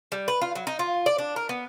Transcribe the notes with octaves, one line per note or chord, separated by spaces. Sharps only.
G3
B4
F4
F#3
D#4
F4
D5
D4
A#4
B3